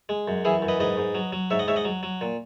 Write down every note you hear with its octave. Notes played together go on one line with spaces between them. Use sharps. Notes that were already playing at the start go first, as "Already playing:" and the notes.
G#3
F#2
E3 E4 G#4
F#2
B4 D#5
G#2 B4 D#5
G#2
F#3
F#3
G#2 C#5 E5
D#5 F#5
G#2 C#5 E5
D#5 F#5
F#3
F#3
A#2